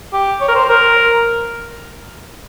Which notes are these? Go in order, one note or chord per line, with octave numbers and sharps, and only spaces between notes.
G4
C#5
A#4
C5
A#4